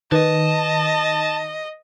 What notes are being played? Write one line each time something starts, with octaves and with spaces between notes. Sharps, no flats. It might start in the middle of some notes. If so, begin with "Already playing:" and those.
D#3 B4 D#5 A5